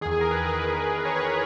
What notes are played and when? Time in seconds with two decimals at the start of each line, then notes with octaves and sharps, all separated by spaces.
0.01 D#3 G#4
0.06 E2
0.11 G#4
0.21 A#4
0.31 B4
0.39 E2 A#4
0.45 D#3 B4
0.78 E2 D#3
1.05 C#5
1.16 E2 D#3 B4